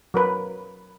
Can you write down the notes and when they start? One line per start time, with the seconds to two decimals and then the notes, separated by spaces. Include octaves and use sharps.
0.14 F#3 A#4 B4